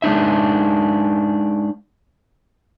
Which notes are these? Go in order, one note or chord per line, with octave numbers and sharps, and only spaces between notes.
G#3 D4 D#4 E5